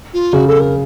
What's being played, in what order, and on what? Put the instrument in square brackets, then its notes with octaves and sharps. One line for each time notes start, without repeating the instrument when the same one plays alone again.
[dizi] F4
[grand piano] C#3 [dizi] F#4
[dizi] A4
A#4